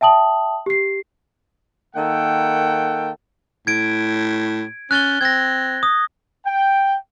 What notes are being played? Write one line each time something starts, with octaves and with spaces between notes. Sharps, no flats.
E5 G5 A5 D#6 F#7
G4 C7
D#3 A#3 A4 F#5 G5
A2 G#6 D7
C#4 F#6 A6 G7
C4 G#6 A#6
D#6
G5